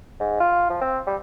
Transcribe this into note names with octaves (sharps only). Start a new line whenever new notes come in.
G#2
F4
F3
C4
G3